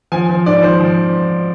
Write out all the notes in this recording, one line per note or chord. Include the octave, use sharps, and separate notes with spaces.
F3 G#5
F3
G#2 D5
F3 C5
F3